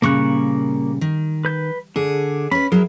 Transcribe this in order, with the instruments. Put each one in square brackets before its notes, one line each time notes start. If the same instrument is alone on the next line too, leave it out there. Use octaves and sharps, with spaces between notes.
[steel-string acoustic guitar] A#2 C#3 G3 [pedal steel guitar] A#3 C#6 F#6
[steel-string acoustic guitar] D#3
[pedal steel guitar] B4 G6
[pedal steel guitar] D3 [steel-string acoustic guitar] G#4
[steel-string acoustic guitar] C#4 B4 [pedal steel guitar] B5
[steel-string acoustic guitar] F#3 E4 [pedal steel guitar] G#4 A#4